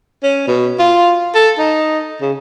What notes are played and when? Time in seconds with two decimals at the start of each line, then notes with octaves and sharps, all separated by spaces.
0.23 C#4
0.47 B2
0.79 F4
1.35 A4
1.59 D#4
2.21 C#3